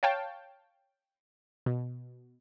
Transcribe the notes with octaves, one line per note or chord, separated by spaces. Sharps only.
C#5 F5 G5 A5
B2